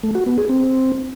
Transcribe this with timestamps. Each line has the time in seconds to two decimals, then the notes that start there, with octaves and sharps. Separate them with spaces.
0.04 A3
0.15 F#4
0.26 B3
0.38 G#4
0.49 C4